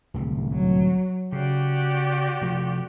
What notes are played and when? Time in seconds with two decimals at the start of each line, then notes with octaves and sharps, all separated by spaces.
0.14 D1 C2 C3
0.52 F#3
1.32 C#3 F#4 G4 D5
2.42 C3 F3